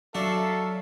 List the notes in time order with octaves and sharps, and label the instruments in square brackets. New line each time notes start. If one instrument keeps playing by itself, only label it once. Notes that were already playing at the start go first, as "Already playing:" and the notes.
[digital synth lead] F#3 [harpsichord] D4 F#4 [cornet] A4 [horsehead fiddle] E5 F5